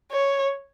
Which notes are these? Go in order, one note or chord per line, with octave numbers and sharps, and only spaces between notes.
C#5